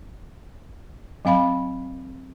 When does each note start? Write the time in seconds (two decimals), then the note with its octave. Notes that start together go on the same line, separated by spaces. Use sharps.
1.25 F#3 C4 F5 B5